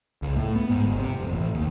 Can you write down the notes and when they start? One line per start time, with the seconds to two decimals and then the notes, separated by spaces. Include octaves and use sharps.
0.22 C#2
0.36 A2
0.56 B3
0.70 G#2
0.86 G1
0.99 C3
1.19 F1
1.31 A1
1.54 D#2